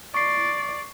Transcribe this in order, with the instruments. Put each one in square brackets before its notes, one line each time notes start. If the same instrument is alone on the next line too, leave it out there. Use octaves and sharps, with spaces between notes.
[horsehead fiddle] D5 [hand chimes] C#6 C7